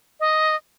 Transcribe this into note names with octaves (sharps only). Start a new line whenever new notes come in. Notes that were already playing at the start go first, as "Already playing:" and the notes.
D#5